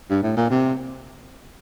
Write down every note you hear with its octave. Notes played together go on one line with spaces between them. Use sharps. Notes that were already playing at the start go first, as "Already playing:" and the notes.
G2
A2
A#2
C3